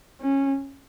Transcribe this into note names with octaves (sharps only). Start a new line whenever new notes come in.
C#4